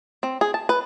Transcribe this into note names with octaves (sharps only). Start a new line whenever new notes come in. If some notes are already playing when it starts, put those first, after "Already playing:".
C4
G#4
A5
B4